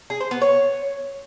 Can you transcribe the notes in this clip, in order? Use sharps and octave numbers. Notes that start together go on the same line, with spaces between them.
G#4
C5
B3
C#5